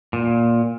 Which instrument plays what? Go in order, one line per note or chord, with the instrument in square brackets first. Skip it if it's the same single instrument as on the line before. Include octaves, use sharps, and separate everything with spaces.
[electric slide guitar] A#2